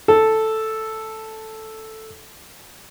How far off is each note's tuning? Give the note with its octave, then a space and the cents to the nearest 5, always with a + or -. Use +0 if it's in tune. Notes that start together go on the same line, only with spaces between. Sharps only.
A4 +0